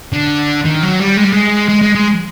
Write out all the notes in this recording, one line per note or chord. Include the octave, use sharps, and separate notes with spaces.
D3
D#3
F#3
G3
G#3
G3
G#3
G#3
G#3
G#3